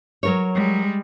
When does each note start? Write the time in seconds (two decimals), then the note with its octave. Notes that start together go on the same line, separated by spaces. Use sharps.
0.23 F#3 A#4 C#5
0.54 G3 G#3